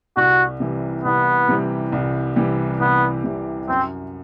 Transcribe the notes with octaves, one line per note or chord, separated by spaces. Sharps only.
C2 F#4
C3 E3 G3
C2 B3
C3 E3 G3
C2
C3 E3 G3
C2 B3
C3 E3 G3
F#2 C4